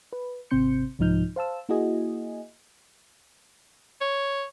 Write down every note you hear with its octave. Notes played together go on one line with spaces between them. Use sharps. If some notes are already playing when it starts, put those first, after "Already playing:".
B4
G#1 C3 C4 C6 G6 C#7
C2 G#2 F3 D#4 F6 G6
C5 F5 A5 E6
A#3 E4 F#4 G#4 D#5 G#5
C#5